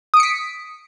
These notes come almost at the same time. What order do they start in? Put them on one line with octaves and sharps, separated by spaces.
D#6 D7 C#7 B6